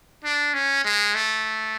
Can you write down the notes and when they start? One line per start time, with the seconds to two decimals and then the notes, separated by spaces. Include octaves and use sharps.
0.25 D4
0.54 C#4
0.85 G#3
1.15 A3